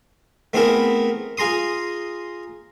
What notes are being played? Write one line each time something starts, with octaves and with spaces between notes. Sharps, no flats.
A3 B3 C4 E4 G#4 A#4
F4 G#4 A#5 C6 D#6